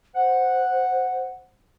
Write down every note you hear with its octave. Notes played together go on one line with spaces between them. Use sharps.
C5 F#5